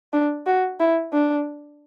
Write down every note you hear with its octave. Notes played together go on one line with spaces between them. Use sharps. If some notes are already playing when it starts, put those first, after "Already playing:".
D4
F#4
E4
D4